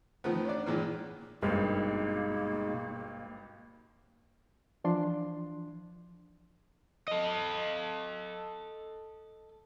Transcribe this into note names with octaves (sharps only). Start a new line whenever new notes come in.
D#3 F3 A3 B3
C#4 D4 D5
A#2 D#3 E3 G#3 A#3
G#1 G2 B2 G#3 A#3 D#4
E3 F3 D4 C6
A4 D#5